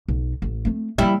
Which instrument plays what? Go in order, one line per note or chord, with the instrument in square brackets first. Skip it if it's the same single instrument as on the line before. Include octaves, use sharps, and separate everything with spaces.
[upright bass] B1
A1
A3 C4
[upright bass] F3 A#3 [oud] G3 E4